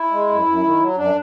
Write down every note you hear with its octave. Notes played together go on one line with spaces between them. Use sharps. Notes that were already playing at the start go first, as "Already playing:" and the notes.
Already playing: E4
G#3
F#2
F#2
D#3
F#3
F#2 D4